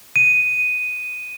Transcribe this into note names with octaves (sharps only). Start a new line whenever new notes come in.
D#7